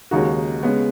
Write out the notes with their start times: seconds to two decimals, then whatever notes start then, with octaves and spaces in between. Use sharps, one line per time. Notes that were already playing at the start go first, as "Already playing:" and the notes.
0.11 D#2 C#3 G#3 D#4 F#4
0.63 C#3 G#3 B3